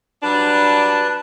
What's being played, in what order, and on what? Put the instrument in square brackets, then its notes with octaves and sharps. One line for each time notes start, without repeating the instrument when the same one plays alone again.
[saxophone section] F#3 G3 D4 [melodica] B4 A5